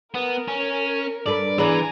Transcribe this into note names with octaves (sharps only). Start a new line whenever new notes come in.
B3 A#4
C#4
G2 A4 B4 D5
E3 B3 G#4 B4 D5 G#5 A#5